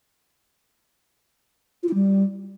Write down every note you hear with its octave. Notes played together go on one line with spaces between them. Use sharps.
F4
E4
G3